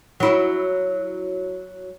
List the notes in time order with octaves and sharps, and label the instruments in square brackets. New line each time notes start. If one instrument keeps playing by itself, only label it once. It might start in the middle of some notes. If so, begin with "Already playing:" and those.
[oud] F#3 E4